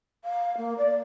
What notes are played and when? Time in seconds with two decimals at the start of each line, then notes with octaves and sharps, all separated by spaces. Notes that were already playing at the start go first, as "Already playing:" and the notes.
0.25 F5
0.57 A#3
0.78 D5